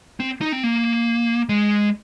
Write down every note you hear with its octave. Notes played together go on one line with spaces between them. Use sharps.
C4
D#4
C4
A#3
G#3